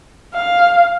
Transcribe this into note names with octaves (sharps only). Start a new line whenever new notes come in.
F5